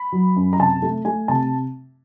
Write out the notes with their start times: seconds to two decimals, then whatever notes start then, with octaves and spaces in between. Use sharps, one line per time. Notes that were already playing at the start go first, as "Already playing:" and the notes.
Already playing: B5
0.12 F#3
0.36 F#2
0.53 A#5
0.59 C3 A5
0.82 A3
1.05 A3 G#5
1.28 C3 A5